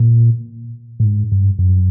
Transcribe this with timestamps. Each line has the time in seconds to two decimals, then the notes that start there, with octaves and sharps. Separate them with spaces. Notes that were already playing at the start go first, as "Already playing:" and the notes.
Already playing: A#2
1.00 A2
1.04 G#2
1.32 G2
1.59 F#2